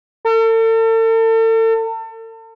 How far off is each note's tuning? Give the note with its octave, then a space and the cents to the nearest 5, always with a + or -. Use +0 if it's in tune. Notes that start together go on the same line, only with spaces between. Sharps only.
A4 +40